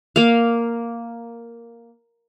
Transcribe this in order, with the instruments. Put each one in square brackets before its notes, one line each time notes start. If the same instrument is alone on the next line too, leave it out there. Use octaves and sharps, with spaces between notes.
[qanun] A#3 F5